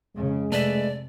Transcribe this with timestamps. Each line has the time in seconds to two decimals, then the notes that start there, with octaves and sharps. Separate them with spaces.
0.16 F2 C#3 G#3
0.52 C3 A3 B4 D5 E5